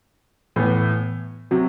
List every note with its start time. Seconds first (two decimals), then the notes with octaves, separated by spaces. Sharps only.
0.56 A2 E3 B3
1.51 C3 F#3